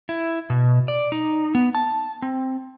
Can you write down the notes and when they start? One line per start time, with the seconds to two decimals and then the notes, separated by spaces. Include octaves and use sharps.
0.09 E4
0.50 B2
0.88 D5
1.12 D#4
1.55 B3
1.75 A5
2.22 C4